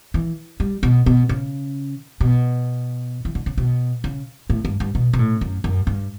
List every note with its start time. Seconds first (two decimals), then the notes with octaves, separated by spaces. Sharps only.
0.14 E3
0.60 G3
0.83 B2
1.06 B2
1.29 C#3
2.20 B2
3.25 E3
3.35 D3
3.46 C#3
3.57 B2
4.04 C#3
4.50 A2
4.65 G2
4.80 G2
4.95 B2
5.13 B2
5.19 A2
5.41 F#2
5.64 F#2
5.87 G2